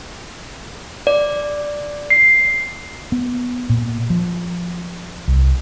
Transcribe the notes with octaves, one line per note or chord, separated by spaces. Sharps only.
D5
C7
B3
A#2
F3
C2